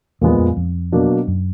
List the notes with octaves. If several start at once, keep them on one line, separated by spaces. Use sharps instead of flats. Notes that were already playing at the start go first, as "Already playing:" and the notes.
E2 A#2 F3 G#3 B3
F2
F2
B2 F#3 A#3 D4
F#2